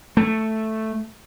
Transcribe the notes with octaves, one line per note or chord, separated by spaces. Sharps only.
A3